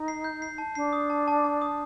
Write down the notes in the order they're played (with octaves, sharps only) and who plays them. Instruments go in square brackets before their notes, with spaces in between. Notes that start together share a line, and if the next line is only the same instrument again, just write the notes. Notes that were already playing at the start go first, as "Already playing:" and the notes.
Already playing: [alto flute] D#4
[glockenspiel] C7
G6
C7
A5
[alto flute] D4 [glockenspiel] C7
[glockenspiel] D#6
A5
A5
A5
D#6